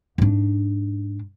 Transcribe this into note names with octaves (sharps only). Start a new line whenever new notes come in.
G#2 D4